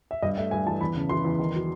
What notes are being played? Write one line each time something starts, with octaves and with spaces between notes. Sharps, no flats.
E5
G2 D#5
A3 E5
G2 G#5
E3 A5
E2 B5
C#3
E3 C6
E2
D#3
F#3